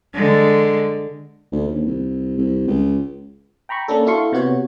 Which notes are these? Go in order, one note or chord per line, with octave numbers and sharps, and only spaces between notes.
D3 G#3
D2
D#2
C2
C2
C#2
G5 A#5 B5 C#6
A#3 C#4 D4 A4
E4 F#4 A4 F5 C6 C#6
C3 B3 F#4 C#5